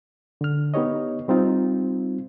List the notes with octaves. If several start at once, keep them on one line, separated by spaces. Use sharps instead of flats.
D3 F6
B3 D#4 G4 C#5 D#5
G3 C4 D#4 F4